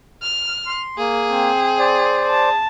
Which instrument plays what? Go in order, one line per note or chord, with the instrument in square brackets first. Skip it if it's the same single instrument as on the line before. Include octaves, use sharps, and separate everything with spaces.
[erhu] F6
[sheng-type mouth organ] C6
[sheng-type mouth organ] A#3 [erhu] G#4
[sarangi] C4
[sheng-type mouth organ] C5 D5
[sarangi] A5